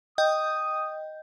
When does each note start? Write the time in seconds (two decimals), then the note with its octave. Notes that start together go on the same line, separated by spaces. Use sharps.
0.18 D#5 G5 D#6 G6